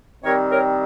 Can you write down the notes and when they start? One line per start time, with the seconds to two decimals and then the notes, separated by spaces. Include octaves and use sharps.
0.23 D#3 G3 C4 A#4 C#5
0.51 A#4 C#5